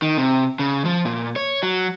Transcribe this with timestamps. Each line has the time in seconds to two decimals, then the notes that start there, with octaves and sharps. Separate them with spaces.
0.02 D#3
0.18 C3
0.59 C#3
0.85 F3
1.05 A#2
1.36 C#5
1.63 F#3